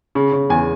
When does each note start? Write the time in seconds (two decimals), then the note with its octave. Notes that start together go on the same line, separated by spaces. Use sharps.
0.15 C#3
0.32 C#3
0.50 E2 G#5